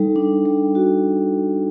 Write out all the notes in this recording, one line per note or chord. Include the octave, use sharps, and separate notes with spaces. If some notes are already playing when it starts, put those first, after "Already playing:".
Already playing: G3 D#4 A4
D4
G3
F#4